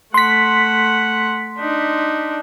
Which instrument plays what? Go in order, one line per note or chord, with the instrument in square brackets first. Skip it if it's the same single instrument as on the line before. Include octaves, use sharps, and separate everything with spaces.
[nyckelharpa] A3 F#5 [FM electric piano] C6 B6
[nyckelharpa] D4 D#4